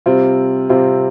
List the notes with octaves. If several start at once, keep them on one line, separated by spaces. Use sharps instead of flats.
C3 G3 C4 F4
C3 G3 C4 F4